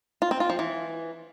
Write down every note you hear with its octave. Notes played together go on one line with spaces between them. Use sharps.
F4
C4
F4
F3
E3